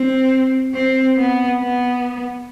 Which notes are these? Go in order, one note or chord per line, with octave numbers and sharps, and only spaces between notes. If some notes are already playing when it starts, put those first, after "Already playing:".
Already playing: C4
C4
B3
B3